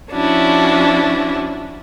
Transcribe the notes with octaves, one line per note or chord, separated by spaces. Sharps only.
F3 C#4 D4 E4 F#4